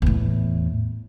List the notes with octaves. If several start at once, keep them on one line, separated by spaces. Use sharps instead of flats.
E2 A2